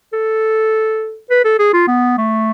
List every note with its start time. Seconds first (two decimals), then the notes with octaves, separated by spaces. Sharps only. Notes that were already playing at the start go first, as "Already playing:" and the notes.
0.13 A4
1.30 B4
1.45 A4
1.59 G#4
1.73 F4
1.88 B3
2.18 A3